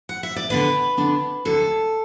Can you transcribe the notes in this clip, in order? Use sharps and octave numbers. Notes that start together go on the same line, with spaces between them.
F#5
E5
D5
D3 B3 D4 B4
D3 B3 D4
D2 D3 F#3 A4